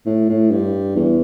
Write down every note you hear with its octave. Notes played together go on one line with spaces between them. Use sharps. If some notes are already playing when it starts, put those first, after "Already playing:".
A2
A2
G2
E2